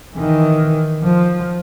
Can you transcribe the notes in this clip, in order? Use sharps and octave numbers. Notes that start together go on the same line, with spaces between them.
D#3 E3
F3